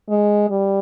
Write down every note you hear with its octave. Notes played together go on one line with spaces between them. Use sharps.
G#3
G3